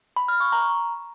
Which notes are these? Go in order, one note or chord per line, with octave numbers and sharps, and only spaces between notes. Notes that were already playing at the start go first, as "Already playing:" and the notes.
B5
F6
C#6
A#5